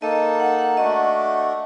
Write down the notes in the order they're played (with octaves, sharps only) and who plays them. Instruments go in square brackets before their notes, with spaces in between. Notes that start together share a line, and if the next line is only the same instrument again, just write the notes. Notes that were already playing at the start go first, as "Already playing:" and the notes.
[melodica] A#3 D#4 A4 [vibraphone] D#5
[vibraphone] F#5
F#5
[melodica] A3 D4 F#4 [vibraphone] D#5